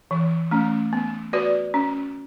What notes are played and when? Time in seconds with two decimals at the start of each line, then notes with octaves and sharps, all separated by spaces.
0.11 E3
0.51 A3 C#4
0.93 B3
1.33 F#4 B4 D5
1.74 C#4